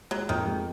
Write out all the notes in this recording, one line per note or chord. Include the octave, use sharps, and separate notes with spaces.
F#3 G#3
F2 D#3
G#3